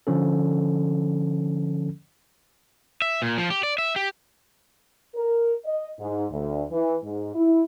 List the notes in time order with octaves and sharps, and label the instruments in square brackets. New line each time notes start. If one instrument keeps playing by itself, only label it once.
[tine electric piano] D3 F3 C#4 A4
[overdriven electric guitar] E5
A#2
F3
G4
D5
E5
G4
[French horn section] A#4
D#5
G#2
D2
E3
G#2
E4